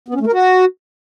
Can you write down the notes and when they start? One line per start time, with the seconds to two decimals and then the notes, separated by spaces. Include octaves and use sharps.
0.08 B3
0.14 C#4
0.21 A3
0.27 A#4
0.33 F#4